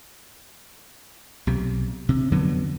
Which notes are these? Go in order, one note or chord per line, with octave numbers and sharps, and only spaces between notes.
B1 C3
C3
F2 D3 F#3 B3